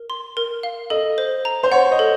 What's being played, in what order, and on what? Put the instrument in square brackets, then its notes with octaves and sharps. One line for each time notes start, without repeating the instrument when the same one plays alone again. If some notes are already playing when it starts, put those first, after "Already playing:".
Already playing: [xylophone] A#4
C6
A#4
F5
[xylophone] A4 [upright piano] D#5
[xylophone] C5
A#5
[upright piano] C5
[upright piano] C#5 [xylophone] F#5
[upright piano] D#5
[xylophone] A4